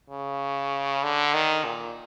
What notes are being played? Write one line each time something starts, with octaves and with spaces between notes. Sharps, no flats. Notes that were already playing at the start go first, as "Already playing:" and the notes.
C#3
D3
D#3
A#2